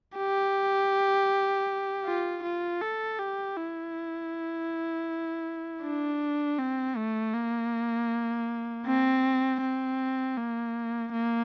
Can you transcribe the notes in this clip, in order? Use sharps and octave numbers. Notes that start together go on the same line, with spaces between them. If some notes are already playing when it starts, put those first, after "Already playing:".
G4
F4
F4
A4
G4
E4
D4
C4
A3
A#3
C4
C4
A#3
A#3